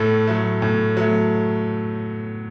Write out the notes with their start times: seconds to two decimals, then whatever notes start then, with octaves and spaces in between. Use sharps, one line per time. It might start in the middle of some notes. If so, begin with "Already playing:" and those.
Already playing: A2 A4
0.27 F#3 A3
0.62 A2
0.97 F#3 A3